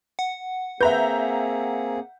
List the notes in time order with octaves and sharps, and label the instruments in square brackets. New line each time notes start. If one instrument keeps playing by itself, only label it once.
[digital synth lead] F#5
[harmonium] A#3 C4 G#4 [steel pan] B4 [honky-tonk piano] E5 A#5 G6